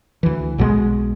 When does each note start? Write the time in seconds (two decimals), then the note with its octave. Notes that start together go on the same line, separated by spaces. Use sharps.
0.23 D2 E3
0.58 B1 B2 E3 G#3